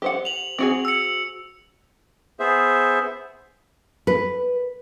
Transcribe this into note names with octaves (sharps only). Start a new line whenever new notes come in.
G4 C5 F#5
F7 F#7
C4 F#4 G#4
E6 C#7
B3 G#4 C5 E5
B4